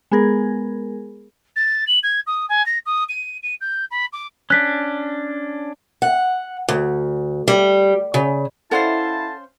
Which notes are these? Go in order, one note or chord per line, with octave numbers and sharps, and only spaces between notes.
G#3 B3 G#4 A#4
A6
F#7
G#6
D#6
G#5
A#6
D#6
D#7
D#7
G6
B5
D6
C#4 D4 F#6 B6
F#5
D2
G3
C#3
C#4 E4 A4 C5 D5 F5 F#5 A5